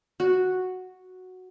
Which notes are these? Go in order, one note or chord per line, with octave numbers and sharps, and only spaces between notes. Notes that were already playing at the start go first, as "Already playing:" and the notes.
F#4